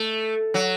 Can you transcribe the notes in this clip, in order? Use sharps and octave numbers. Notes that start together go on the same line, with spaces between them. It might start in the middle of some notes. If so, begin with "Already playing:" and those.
Already playing: A3
F#3